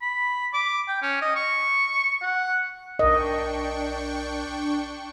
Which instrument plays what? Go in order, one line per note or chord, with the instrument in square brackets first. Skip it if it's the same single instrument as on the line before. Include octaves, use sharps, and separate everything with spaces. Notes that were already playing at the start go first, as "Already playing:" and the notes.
[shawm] B5
D6
G5
C#4
D#5
C#6
F#5
[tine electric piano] B1 A#4 [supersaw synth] D4 G5 C#6 [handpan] D#5